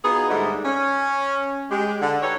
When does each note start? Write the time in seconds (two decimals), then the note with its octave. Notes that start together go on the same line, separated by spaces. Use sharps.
0.05 B3 D#4 F4 F#4 G#4
0.29 G#2 D3 G3 A3 D4 D#4
0.65 C#4
1.70 G#3 G4
2.01 D3
2.22 D#4 G4 A4 B4 C#5